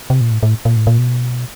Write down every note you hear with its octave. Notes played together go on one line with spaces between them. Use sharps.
C3
A#2
A2
A2
A#2
A2
A#2
B2